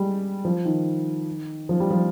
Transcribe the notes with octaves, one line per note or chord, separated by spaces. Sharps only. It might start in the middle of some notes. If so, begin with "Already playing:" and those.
Already playing: G3 G#3
F3
D#3
F3
G3
F3